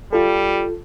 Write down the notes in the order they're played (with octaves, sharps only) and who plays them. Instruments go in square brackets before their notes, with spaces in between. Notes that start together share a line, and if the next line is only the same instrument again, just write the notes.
[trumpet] G3 [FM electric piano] F4 A4